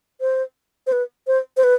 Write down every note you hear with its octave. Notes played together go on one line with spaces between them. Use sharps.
C5
C5
B4
C5
C5
B4